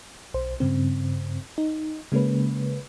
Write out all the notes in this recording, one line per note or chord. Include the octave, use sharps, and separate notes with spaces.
B1 C5
G2 C#3 C4
D#4
C#3 G#3 A#3 C#4 B4